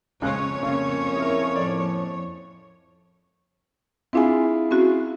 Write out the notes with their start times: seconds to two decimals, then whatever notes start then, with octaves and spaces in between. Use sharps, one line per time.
0.22 F2 C#3 G#3 C#4 C#5 F#6
0.63 C#3 A#3 C#4
1.15 E4 G#4 A#4
1.56 A2 F3 D5
4.13 C4 D4 E4 F4 G#4 G#5
4.70 C4 C#4 F#4